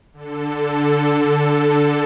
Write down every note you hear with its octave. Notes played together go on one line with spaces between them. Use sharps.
D3 A4